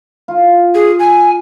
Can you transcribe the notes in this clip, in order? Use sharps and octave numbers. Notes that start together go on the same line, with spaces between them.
F4
G#4
G#5